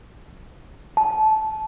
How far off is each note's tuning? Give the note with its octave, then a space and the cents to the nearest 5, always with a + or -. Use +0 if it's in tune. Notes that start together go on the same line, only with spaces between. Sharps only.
A5 -20